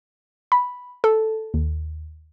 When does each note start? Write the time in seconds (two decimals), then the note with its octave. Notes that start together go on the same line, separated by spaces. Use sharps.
0.52 B5
1.04 A4
1.54 D#2